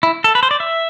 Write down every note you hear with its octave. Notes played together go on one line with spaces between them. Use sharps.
E4
A4
B4
C5
D5
E5